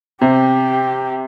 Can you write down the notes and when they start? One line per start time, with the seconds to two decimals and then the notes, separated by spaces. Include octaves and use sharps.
0.21 C3 G4